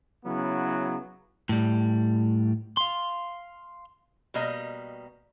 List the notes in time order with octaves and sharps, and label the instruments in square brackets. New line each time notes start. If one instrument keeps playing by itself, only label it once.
[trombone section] C#3 F#3 B3 E4
[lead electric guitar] A2 G3
F5 C6
[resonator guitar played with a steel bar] B2 G3 A#3 D#5